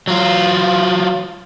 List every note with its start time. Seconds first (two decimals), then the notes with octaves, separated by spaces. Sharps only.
0.07 F#3 F4